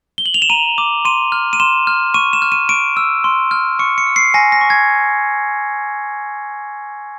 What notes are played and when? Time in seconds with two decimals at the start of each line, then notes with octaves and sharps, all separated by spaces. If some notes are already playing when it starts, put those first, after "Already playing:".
0.18 G7
0.26 F#7
0.34 F7
0.42 E7
0.50 A#5 D#7
0.78 D6
1.05 C6 D#7
1.32 F6
1.53 D#7
1.60 C6 E7
1.87 F6
2.14 C#6 D#7
2.33 E7
2.42 F6
2.52 D#7
2.69 C#6 D7
2.97 E6
3.24 C6
3.51 F6
3.79 C#6 C#7
3.98 C#7
4.07 E6
4.16 C7
4.34 G#5 A#6
4.52 A#6
4.61 C#6
4.70 G#6